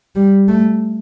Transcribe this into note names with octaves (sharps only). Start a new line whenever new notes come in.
G3
A3